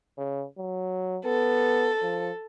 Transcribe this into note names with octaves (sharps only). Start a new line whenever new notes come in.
C#3
F#3
B3 A4
F3